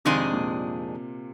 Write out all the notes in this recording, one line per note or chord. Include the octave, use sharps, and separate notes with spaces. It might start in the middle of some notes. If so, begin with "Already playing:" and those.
F2 C3 D#3 G#3 D4 G#4
A#2